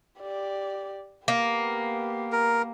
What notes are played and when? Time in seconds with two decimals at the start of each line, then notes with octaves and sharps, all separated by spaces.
0.20 G4 D5
1.28 A#3 B3 G4
2.32 A#4